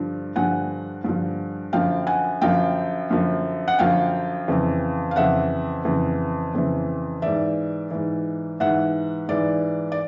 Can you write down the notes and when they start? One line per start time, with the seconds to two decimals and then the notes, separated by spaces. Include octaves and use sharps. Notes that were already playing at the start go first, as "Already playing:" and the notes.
Already playing: G2 D3 F3
0.36 G2 D3 F3 F#5 G#5
1.04 G2 D3 F3
1.73 F#2 D3 F3 F5 G5
2.07 F#5 G#5
2.42 F#2 D3 F3 F5 G5
3.11 F#2 D3 F3
3.68 F#5
3.79 F#2 D3 F3 F5 G5
4.48 F2 C#3 E3
5.11 F5
5.16 F2 C#3 E3 E5 F#5
5.85 F2 C#3 E3
6.55 F2 C#3 E3
7.22 G#2 E3 D5 E5
7.91 G#2 E3
8.60 G#2 E3 E5 F#5
9.28 G#2 E3 D5
9.92 D5